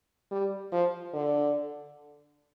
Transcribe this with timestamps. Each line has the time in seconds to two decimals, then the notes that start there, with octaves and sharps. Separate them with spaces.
0.31 G3
0.72 F3
1.14 D3